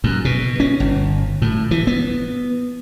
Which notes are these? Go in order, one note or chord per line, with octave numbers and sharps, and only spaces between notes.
F#2
B2
C#4
G1
A2
E3
B3